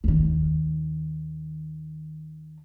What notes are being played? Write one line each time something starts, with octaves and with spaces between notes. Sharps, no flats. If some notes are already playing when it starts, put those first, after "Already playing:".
D#2 D#3